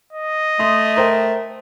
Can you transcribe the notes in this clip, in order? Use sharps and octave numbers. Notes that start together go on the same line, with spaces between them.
D#5
A3 C6 D#6
A#4 C5 G5